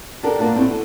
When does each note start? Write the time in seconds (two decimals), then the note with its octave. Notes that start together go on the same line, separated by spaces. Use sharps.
0.23 D4 F#4 G4 A4 A#4
0.39 A#3 D4 F4 F#5
0.55 A3 C4 D4 E4 F#4
0.68 D3 A4